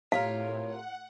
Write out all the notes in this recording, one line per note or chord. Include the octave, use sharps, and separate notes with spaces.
A2 C3 F4 A#4 C#5 F5
F#5